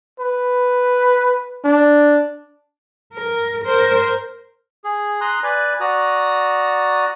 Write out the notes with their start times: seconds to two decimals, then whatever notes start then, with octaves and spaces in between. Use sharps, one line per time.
0.20 B4
1.64 D4
3.14 A#4
3.64 A#4 C5
4.84 G#4
5.21 A#5 C6 D#6 F#6
5.43 B4 D5 G#5
5.81 F#4 D5 A#5 D#6